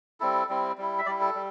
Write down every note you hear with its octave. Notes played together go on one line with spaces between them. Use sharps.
G3 C4 E4 A4
G3 C4 E4
G3 E4
E5
G3 E4 D5
A4
G3